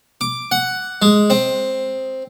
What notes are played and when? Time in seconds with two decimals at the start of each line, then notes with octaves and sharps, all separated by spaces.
0.21 D6
0.51 F#5
1.02 G#3
1.30 C4